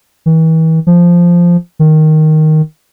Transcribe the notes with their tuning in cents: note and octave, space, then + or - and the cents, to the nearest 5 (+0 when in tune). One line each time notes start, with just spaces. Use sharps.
E3 -40
F3 -5
D#3 +0